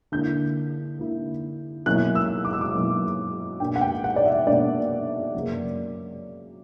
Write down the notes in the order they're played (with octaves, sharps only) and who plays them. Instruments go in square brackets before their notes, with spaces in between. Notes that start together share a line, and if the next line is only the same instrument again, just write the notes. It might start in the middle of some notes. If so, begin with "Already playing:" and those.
[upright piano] D3 A#3 E4 G6
D3 A#3 E4
B2 F#3 A#3 C#4 E4 F#6
E6
D6
E6
D6
B2 F#3 A#3 C#4 E4
B2 A#3 D4 G5
F#5
G5
F#5
D5
E5
B2 A#3 D4 D5
F#2 C#3 F#3 A#3